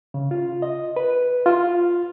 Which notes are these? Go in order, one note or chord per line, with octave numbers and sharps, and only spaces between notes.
C#3
F4
D#5
B4
F4